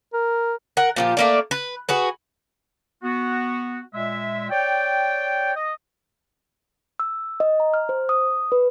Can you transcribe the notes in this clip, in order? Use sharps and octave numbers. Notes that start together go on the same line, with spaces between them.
A#4
A#4 F#5
A#2 F3 G4
A3 A#3 D5
B4
F#4 G#4 B4
B3 F#4
A#2 G#3 E5
C#5 D5 G5
D#5
E6
D#5
A#5
F6
C5
D#6
B4